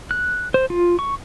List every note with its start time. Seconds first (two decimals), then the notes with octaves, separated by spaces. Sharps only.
0.11 F#6
0.54 C5
0.70 F4
0.99 C#6